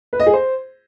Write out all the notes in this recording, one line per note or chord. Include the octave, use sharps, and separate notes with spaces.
B4
D#5
G#4
C5